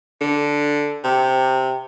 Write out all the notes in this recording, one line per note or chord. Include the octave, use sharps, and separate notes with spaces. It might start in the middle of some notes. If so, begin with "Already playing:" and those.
D3
C3